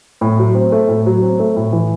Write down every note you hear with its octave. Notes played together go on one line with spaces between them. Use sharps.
A2
F#3
C4
A3
A2
F#3
C4
A3
A2
E3